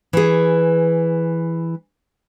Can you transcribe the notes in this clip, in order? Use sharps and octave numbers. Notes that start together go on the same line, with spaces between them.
E3 G#4